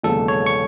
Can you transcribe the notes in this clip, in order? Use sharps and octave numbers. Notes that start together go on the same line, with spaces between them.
E1 D#2 C#3 F#3 A4
C#5
C#6